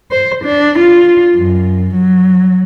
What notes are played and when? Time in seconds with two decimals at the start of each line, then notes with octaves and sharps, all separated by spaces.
0.12 C5
0.44 D4
0.78 F4
1.36 F#2
1.94 F#3